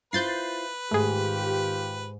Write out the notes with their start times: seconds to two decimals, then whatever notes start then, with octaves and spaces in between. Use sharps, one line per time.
0.13 E4 F4 B4 C5 G6 A6 C7
0.91 G#2 D#3 A3 F4 G4 G#4